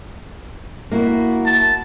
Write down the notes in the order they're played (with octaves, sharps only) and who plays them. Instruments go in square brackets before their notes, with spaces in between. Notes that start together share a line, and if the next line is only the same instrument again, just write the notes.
[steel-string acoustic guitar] A#3 E4 F#4
[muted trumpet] A5